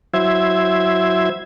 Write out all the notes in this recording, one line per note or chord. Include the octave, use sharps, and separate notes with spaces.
F#3 E4 C5 E5 G#6